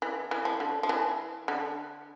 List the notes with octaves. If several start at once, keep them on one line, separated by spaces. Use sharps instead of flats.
E3
E3
F3
D3
F3
E3
D3